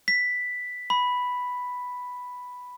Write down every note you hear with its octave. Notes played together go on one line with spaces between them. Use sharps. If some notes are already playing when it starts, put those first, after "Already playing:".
B6
B5